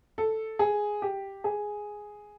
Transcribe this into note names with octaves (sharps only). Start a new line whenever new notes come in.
A4
G#4
G4
G#4